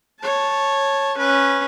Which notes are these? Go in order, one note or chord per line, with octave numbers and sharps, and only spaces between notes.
C#5 A5
C#4 B4